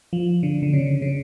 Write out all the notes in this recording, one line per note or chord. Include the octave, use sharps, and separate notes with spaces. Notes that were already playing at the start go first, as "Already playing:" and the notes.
F3
D3
D3
C#3
C#3